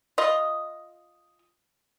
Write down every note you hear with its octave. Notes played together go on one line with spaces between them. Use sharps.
F4 D#5